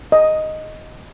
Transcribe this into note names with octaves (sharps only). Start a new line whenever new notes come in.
D#5